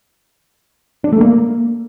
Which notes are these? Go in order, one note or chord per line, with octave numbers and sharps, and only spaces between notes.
D4
A3
A#3